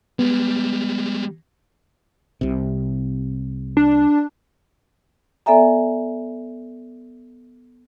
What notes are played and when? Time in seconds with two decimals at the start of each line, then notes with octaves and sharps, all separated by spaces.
0.19 G3 G#3 B3
2.41 C2 C3
3.77 D4
5.46 B3 A4 D5 E5 G#5 A#5